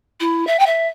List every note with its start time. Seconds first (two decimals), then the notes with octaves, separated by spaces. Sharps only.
0.20 E4
0.47 E5
0.59 G5
0.66 E5